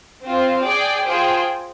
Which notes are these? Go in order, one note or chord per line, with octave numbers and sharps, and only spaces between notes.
C4 F4 C5
G#4 D5 G5
F4 G#4 C5 G5